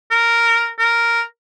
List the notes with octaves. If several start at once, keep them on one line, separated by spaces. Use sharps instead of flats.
A#4
A#4